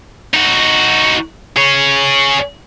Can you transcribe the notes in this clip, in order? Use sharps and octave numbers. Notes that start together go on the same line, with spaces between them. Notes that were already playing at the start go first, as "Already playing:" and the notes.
D#4 F#4
G#4 C#5